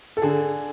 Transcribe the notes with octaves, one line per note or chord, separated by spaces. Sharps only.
A4
D3 G#4